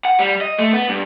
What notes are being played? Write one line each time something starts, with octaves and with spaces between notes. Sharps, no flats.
F#5
G3
D#5
A3
B3
G2